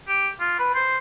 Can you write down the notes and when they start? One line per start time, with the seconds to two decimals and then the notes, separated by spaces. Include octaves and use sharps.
0.08 G4
0.40 F4
0.59 B4
0.74 C5